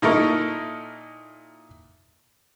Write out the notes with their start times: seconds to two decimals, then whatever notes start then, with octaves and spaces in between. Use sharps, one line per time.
0.02 A#2 D#4 E4 A4 A#4 C#6